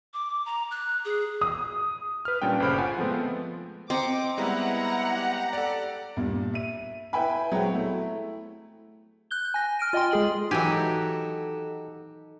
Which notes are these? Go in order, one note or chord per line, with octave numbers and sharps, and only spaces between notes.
D6
A#5
F#6
G#4
D#6
B4 F6
A#2 G3 C#4 D4 G5
G1 C#3 C5 B5 F6 D7
F4 F#5 G#5
F3 G#3 A3 B3 C4
C4 C5 D#5 A#5 D6 C#7
G3 G#3 B3 E4 F#5 A#5
G4 F#6
A4 D5
G2 A#2
E5 D#7
E4 B4 E5 G5 G#5 B5
F#3 G#3 C4 F#4 G5
A3 E4
F#6 G6 G7
G#5 A#6
F6 D7 D#7
F4 D#5 G5 G#5 C6
G#3 G#4 F#7
E3 F#3 D#4 F#4 G4 A4 G#5